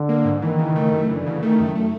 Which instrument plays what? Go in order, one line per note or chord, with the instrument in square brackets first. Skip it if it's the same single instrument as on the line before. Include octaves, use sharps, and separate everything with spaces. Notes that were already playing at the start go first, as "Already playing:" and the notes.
Already playing: [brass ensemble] D3
[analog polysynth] A#3
G#2
[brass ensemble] D#3 [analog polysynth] E3
[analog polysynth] C#3
A3
F#2
[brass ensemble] D3 [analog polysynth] E3
[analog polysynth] C#3
[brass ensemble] D#3 [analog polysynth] A3
[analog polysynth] F#2
A3